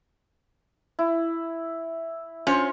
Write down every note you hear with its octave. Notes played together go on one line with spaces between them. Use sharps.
E4
C#4 F4 C5